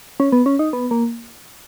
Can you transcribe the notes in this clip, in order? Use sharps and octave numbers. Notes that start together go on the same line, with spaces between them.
C#4
B3
C#4
D#4
B3
A#3